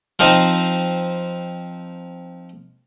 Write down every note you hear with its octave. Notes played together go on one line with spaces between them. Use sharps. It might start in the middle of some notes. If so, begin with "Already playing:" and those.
F3 C4 D#4